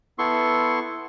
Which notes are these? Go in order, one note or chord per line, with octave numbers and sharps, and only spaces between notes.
B3 E4 A4 C6 C#6